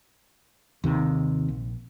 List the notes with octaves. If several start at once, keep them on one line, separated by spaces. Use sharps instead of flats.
D#2 C3 D#3
A#1